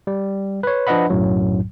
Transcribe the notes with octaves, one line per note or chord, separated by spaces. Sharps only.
G3
B4 C#5
F3 D4 B4 D#5 F#5 B5
B1 F#2 A2 F#3